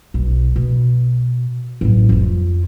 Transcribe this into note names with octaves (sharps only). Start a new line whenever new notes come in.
B1
B2
A1 F#3
F2 F4